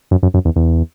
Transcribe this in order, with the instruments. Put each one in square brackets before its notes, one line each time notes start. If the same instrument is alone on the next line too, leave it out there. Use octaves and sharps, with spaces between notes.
[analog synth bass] F#2
F#2
F#2
E2
E2